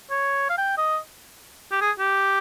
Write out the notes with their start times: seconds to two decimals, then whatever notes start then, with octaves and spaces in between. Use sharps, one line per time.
0.11 C#5
0.49 F5
0.58 G5
0.78 D#5
1.72 G4
1.81 G#4
1.99 G4